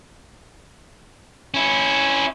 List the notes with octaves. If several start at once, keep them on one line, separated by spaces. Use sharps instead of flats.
C#4 E4